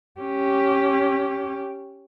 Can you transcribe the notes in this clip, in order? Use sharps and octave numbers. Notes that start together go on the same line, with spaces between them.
C#4 G4